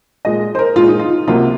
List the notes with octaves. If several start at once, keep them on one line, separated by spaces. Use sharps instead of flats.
A#2 G#3 D#5
C5
A#4
A#2 G#3 F4
D#4
F4
C#2 C3 F#3 A#3 F4